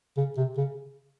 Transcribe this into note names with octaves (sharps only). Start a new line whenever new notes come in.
C#3
C3
C#3